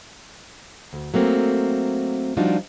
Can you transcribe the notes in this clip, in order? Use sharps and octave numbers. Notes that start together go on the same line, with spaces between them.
D2
F#3 A3 A#3 C4
F3 G3 D4 D#4 F4 F#4